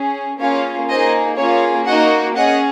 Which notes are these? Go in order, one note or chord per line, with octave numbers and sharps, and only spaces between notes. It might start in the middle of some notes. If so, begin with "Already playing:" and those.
Already playing: C#4 G#4
A#3 C#4 F4 G#4 C#5 F5
A#3 D#4 G#4 C5 D#5
A#3 C#4 F4 G#4 C#5
A#3 D#4 F#4 D#5 F#5
C#4 G#4 D#5 F#5